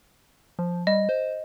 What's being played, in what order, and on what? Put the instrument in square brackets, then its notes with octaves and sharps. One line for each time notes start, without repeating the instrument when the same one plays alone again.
[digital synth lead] F3
[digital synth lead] G3 [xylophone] D#5
[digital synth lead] C5